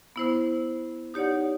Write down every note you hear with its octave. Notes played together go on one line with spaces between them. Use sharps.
B3 E4 C5
D#4 G4 C#5 D5 F#5